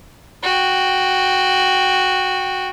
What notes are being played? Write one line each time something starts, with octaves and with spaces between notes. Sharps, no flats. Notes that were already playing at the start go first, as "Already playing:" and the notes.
F#4 G5